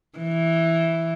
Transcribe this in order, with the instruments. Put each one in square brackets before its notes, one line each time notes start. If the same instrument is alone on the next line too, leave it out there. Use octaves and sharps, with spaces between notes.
[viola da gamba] E3